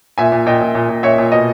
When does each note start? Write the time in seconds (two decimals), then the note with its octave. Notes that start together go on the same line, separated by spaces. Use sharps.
0.18 A#2 E5 G#5
0.32 A#2
0.46 A#2 D#5 G5
0.61 A#2
0.75 A#2
0.89 A#2
1.03 A#2 C#5 E5
1.18 A#2
1.32 B2 D#5